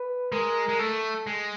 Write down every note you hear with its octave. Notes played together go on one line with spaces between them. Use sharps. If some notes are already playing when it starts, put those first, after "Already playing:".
Already playing: B4
G#3 A#4
G#3
A3 A4
G#3